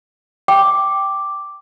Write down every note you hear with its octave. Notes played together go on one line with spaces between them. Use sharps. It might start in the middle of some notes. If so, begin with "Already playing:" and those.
G5 D6